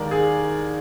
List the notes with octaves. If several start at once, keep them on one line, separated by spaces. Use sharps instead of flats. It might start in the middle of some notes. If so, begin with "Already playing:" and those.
Already playing: D#2 D#3 G#3 A#4 D5
G#4